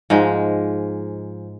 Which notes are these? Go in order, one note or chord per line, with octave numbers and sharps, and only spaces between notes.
G#2 F3 G#3